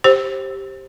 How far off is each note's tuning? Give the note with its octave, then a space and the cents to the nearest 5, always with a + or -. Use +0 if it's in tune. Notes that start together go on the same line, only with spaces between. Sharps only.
G4 +0 C5 +20